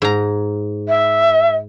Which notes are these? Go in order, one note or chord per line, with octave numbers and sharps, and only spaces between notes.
G#2 A#5
E5